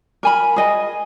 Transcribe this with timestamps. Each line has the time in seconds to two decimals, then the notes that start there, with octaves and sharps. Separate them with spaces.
0.23 A#4 G#5 B5
0.56 G#4 D#5 G#5